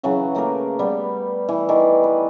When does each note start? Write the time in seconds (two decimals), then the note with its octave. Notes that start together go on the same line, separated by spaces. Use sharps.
0.03 C#3 E3 F#3 F#5
0.35 A3 A#3 G#4 A#4
0.79 G3 B3
1.49 E3
1.69 D#3 E3 D5
2.04 B4